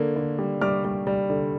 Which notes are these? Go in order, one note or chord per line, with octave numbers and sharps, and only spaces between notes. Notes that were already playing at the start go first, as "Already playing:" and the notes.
Already playing: D3 A#3
D3
G3
G3 D6 F6
G3
G3
D3